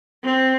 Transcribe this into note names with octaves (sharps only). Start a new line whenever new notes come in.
C4